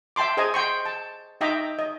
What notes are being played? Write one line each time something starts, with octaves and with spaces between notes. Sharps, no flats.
E5 G5 A5 C6 D6
G#4 C5 D#5 G#5 A#5
G5 C6 C#6
A5
D#4 D#5 E5 G5 A#5 D6
D#5